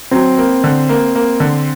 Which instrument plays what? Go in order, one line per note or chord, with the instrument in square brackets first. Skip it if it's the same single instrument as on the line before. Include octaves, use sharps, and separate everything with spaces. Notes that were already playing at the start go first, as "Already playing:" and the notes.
[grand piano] F#3 [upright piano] C4
[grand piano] A#3
D3
A#3
A#3
D3